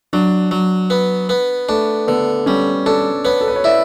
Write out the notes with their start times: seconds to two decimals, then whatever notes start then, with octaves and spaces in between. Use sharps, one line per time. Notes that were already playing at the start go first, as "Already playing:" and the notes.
0.13 F#3 D4
0.51 F#3
0.90 B3
1.29 B3
1.69 A3 D4
2.07 D3 B3
2.46 G3 C#4
2.86 D4 A4
3.24 B3 C#5
3.41 A4
3.48 B4
3.56 C#5
3.64 E4 D5